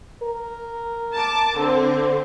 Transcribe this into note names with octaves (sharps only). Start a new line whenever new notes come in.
A#4
A5 D6
D3 C4 C5